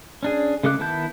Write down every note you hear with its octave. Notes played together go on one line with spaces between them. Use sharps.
C#4 D4 G#4
C#3 G#3 A4 D6 F#6
D#3 B3 E4 A5 G6